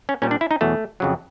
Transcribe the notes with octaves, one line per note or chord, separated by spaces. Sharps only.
C#4
A#2 G3 C#4
D4
E4
D#4
E2 B2 F#3 A3
F2 C#3 F#3